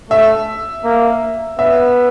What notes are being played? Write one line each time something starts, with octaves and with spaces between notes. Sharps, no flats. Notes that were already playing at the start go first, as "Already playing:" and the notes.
A3 E5
A#3
B3 E5